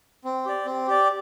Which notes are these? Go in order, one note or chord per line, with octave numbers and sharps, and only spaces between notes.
C4
G4 D5
C4
G4 D5